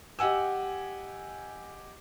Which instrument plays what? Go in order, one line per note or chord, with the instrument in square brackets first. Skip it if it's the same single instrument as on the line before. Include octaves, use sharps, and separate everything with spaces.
[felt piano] G4 D#5 F#5 G#5 E6